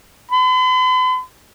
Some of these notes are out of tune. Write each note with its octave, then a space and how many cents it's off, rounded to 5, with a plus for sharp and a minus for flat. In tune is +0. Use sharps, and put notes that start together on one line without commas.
B5 +45